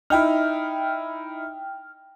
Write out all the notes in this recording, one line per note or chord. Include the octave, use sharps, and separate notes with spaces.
D#4 E4 G5 F6